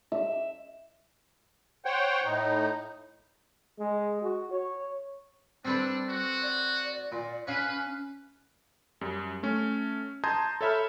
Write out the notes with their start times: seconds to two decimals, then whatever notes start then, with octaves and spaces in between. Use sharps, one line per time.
0.12 E5
1.85 C5 C#5 F#5 G5
2.25 A2 D#4
3.79 G#3
4.22 F#4
4.51 C#5
5.65 G3 C4 D4 A4 B4
6.09 F#4
6.42 D5
7.12 A#2
7.47 C#4 B4 C#5 F5
9.01 F#2 G3
9.43 A3 C#4
10.24 A5 A#5 C6 D#6 G6 G#6
10.61 A4 C#5 E5 B5 F6